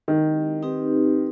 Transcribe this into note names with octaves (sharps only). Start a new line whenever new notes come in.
D#3 G#3 C4 E4 G4 A#4
C4 D#4 G4 B4